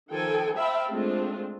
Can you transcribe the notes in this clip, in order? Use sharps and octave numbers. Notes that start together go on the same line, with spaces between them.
D#3 F3 A4 G5 G#5
C5 E5 F5 G5 A5 B5
G#3 A3 C4 D4 F4